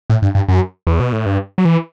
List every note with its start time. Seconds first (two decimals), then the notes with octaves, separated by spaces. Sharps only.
0.10 A2
0.22 G2
0.35 G2
0.48 F#2
0.87 E2
1.00 B2
1.13 A2
1.26 G2
1.58 F#3
1.65 E3